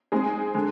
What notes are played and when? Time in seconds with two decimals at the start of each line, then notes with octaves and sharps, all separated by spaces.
0.12 G#3 C4 D#4 G#4
0.54 D3 G#3